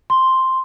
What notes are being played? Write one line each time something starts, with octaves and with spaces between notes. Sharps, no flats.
C6